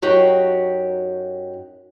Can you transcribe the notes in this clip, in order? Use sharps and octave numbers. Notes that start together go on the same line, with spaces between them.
F#2 D#4 F#4 G4 G5